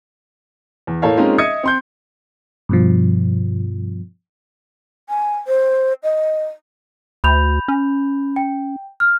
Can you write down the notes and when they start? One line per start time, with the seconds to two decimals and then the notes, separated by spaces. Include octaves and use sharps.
0.87 E2
1.02 A2 A#3 A4 C#5 F5
1.17 G#3 A#3 C4 C#4 D#4 F4
1.38 D#5 E5 D#6 G#6 C#7
1.63 C4 C6 G6
2.69 G2 B2 F3
5.09 G#5
5.47 C5
6.03 D#5
7.24 D2 B5 G6 F7
7.68 C#4
8.36 G5
9.00 F6